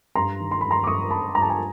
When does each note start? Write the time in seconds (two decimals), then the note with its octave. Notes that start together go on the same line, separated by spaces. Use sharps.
0.15 G2 A#5 C6
0.40 D#3
0.51 C6
0.61 G2 B5
0.71 A#5 C6
0.84 D6
0.87 G2 C#6 D#6
1.10 G2 A5 B5
1.35 G2 A#5
1.42 A5
1.49 G#5 A#5